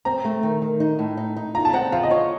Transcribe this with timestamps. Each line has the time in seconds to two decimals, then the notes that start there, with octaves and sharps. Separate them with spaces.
0.05 C4 A#5
0.25 A3
0.43 D#3
0.62 D#3
0.80 D#4
0.99 A2
1.17 D#4
1.36 D#4
1.54 F4 A#5
1.65 A5
1.73 C4 F#5
1.92 F3 F5
2.03 D#5
2.11 F4 C#5